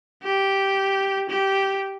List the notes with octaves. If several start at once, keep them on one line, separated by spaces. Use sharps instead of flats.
G4
G4